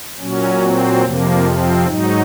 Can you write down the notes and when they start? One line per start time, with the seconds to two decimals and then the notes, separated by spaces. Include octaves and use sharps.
0.20 A#2 F#3 C#4
0.62 C4
1.02 F2 C3 F3 A#3
1.44 C4
1.86 G#2 F#3 D#4